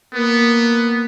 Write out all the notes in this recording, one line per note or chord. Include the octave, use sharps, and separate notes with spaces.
A#3 B3